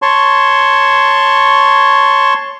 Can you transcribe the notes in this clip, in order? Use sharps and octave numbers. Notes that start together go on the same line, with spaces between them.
C#5 A5 C6 C#6